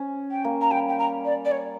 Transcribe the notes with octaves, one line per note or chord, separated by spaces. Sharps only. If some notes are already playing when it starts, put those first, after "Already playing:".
Already playing: C#4
G5
A#3
A#5
G3 G5
G5
A#5
D5
D5
C#5